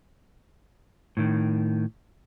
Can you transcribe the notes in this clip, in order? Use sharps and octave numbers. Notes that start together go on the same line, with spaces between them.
A2 D#3